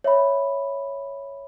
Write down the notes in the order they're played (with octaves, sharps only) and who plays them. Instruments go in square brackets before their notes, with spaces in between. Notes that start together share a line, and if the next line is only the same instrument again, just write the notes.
[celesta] C#5 E5 B5